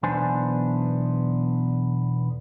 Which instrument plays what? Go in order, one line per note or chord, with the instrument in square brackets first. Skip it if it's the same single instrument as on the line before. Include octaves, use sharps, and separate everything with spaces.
[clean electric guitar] B1 E2 B3 D4 C5 G#5